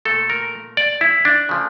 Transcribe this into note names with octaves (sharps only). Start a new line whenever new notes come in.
A#2 A3 A4
A#4
D5
E4
D4
C#3 F3 A3